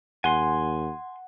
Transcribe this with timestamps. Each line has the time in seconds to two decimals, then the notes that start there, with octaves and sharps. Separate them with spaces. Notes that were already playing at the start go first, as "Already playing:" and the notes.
0.24 D#2 F#5 G#5 C6